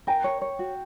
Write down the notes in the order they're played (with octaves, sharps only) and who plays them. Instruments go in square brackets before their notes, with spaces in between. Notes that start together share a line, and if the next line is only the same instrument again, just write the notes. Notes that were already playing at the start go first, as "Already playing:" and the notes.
[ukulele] A#4 [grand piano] G5
[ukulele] C#5
C#5
F#4